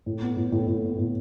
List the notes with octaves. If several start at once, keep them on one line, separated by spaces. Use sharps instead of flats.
A2
B3
A2
A2
A2
B3
A2